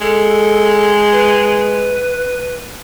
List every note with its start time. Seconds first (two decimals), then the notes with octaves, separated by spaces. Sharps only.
0.01 G#3 A4
1.12 B4